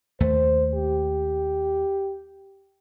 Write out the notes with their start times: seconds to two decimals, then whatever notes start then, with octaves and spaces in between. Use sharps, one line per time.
0.20 D#2 A3 C5
0.74 G4